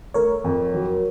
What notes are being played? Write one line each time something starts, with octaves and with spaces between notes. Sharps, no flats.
A3 A#4 C#5
F2
F#3